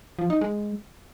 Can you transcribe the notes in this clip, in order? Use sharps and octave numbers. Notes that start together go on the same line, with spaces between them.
F3
D#4
G#3